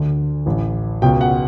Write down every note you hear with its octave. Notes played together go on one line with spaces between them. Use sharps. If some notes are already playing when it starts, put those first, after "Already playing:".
Already playing: D2 D3
A1 A2 E3
C#2 B2 G5
F#5